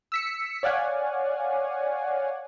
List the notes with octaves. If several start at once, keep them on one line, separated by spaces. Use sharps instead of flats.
E6 B6 C#7
C#5 D5 F5 F#5 G#5